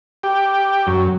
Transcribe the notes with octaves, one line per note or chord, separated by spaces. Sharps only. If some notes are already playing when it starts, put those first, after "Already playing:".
G4
F#2